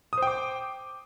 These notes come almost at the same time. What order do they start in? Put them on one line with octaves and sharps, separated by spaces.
D#6 C5 G5 D6